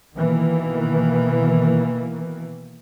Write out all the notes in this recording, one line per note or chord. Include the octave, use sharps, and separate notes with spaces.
B2 D#3 E3 A#3